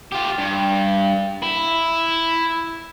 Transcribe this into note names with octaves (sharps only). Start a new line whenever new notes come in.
F4 G4
G2
E4